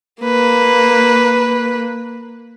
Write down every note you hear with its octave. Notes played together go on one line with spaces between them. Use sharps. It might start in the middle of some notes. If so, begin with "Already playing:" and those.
A#3 B4